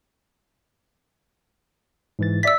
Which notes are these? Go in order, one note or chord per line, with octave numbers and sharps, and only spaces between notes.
G#2 E3 A6
D5 E5 E6 A6 B6